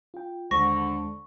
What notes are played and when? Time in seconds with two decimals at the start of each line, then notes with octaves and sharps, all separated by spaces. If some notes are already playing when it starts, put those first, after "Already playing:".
0.14 F4 G5
0.51 D#2 D3 G#3 C5 C#6 A#6